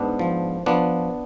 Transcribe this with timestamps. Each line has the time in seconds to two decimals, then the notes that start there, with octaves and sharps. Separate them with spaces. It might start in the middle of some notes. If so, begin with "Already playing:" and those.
Already playing: G#2 B3 D4
0.19 F3
0.66 F3 B3 D4